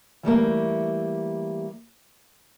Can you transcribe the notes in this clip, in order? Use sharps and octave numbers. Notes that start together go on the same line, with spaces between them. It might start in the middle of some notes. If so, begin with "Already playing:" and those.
E3 G3 A3 A#3